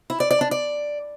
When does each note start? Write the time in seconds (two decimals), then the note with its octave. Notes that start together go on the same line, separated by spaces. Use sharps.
0.10 E4
0.20 D5
0.31 D5
0.41 D4
0.51 D5